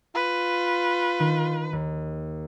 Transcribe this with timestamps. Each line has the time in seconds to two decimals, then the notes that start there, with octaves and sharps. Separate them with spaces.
0.15 F4 B4
1.19 D#3 D#4 D#7
1.73 D#2